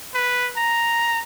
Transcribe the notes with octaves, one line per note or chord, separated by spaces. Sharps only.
B4
A#5